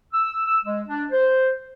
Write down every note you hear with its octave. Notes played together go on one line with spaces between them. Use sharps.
E6
E6
G#3
D4
C5